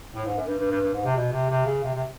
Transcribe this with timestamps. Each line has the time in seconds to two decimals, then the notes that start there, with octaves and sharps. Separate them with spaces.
0.14 A2
0.26 G#2
0.37 F#2
0.47 G2
0.58 G2
0.71 G2
0.81 G2
0.93 G#2
1.04 C3
1.16 B2
1.32 C3
1.49 C3
1.66 C#3
1.84 C3
1.94 C3